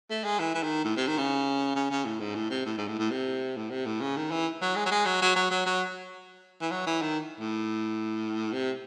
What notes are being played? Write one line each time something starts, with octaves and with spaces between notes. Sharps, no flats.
A3
G#3
E3
E3
D#3
A2
C3
D#3
C#3
C#3
C#3
A2
G#2
A2
C3
A2
G#2
A2
A2
C3
A2
C3
A2
C#3
D#3
E3
F#3
G#3
F#3
G#3
F#3
F#3
F#3
F#3
F#3
E3
F#3
E3
D#3
A2
C3